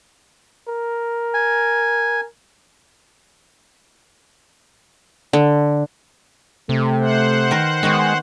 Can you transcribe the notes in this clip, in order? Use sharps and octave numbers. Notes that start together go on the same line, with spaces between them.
A#4
G#5
D3
C3 A3
C5 F#5
D#3 A#4 B4
D#3 G#3 B3 F#4